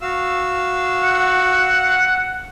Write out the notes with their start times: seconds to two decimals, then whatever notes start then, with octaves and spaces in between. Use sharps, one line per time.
0.01 F#4 F5 E6
1.03 F#5